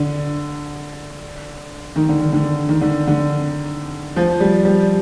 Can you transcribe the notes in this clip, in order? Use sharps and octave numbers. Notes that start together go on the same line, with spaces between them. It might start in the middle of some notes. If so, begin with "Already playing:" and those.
Already playing: D3
D#3
D3
D#3
D3
D#3
D3
D3
F3
G3
G3